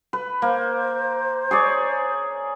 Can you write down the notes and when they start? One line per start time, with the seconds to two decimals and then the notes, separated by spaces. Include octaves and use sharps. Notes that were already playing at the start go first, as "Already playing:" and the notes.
0.13 B4
0.42 A#3 C5
1.51 G#4 C#5 D5